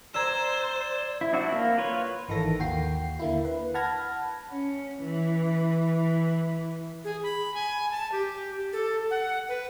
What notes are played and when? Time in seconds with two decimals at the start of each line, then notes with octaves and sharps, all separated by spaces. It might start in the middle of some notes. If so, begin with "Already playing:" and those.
0.14 C5 D5 A#5 E6 G#6 E7
1.21 E4
1.33 C4 D4 E4 F#4
1.52 A#3
1.78 F4 B4 C#5
2.29 G#1 D#3 E3 A4 A#6
2.59 D#2 A#3 F#4 G5 C7
3.19 D3 A#3 E4
3.45 B4
3.74 F#5 A5 B5 F6 G#6 A#6
4.52 C#4
5.04 E3
7.04 G#4
7.23 B5
7.54 G#5
7.91 A5
8.12 G4
8.73 A4
9.11 F#5
9.49 B4